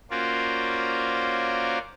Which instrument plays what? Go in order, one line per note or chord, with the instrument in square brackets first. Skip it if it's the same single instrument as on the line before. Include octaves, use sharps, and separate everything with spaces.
[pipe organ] A#3 C#4 F4 F#4 C5 D5